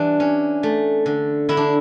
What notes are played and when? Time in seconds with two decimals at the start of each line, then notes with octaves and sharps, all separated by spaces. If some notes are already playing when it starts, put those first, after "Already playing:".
Already playing: E3 G3 D4
0.20 C#4
0.63 A3
1.06 D3
1.49 D3 E4
1.57 D4